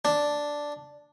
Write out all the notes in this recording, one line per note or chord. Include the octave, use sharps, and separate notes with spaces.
D4